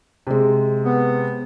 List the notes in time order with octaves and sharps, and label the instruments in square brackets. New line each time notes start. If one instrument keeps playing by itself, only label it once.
[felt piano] C3 G#3
[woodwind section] B3